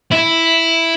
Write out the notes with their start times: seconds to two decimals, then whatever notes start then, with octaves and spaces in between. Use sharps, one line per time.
0.11 E4